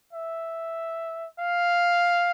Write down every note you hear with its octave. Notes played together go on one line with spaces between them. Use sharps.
E5
F5